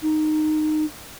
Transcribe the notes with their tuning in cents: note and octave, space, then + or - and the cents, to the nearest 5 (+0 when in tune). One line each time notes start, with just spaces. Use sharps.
D#4 -15